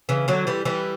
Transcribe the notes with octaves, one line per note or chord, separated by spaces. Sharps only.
C#3 E3
D3 F#3
E3 G3
E3 G3